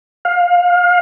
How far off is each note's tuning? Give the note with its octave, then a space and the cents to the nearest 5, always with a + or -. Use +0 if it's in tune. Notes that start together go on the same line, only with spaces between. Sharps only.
F5 +25